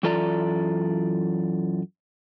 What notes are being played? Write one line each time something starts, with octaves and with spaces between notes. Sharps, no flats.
F#2 E3 F4 A4 D5 A#5